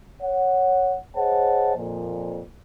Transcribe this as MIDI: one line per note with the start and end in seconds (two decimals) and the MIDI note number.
0.22 0.96 73
0.22 0.96 78
1.17 1.74 68
1.17 1.74 72
1.17 1.74 73
1.17 1.74 75
1.17 1.74 78
1.17 1.74 81
1.77 2.41 41
1.77 2.41 46